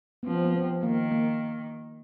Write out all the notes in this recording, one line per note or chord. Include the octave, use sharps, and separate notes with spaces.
B3
F3 C4
B3
C4
D#3 A#3
A#3